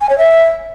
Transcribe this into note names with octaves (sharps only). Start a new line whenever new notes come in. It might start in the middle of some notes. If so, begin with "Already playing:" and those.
G#5
C#5
E5